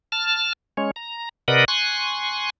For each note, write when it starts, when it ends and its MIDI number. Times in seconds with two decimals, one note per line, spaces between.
0.12 0.53 81
0.12 0.53 89
0.77 0.91 56
0.77 0.91 61
0.77 0.91 73
0.96 1.29 82
1.48 1.65 48
1.48 1.65 70
1.48 1.65 71
1.48 1.65 74
1.48 1.65 75
1.48 1.65 78
1.68 2.50 80
1.68 2.50 84
1.68 2.50 85
1.68 2.50 90